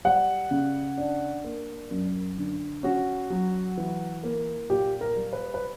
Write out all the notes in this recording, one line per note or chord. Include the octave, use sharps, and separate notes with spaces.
G3 F#5
C#3
D4
A#3
F#2
D3
C#4 F#4
F#3
E3
A#3
A#2 G4
A#4
G3
B4
B4